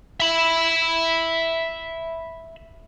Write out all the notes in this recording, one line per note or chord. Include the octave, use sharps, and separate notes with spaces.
E5 B5